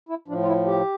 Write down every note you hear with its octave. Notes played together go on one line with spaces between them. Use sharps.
E4
A2 F3 D4
F4
E4
G4